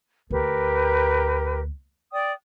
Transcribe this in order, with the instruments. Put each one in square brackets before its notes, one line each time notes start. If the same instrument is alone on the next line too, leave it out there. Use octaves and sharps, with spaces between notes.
[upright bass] D2 [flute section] G4 A#4 B4
[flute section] D5 G5 D#6